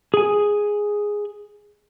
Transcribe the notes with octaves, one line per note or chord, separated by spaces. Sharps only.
G#4 G#5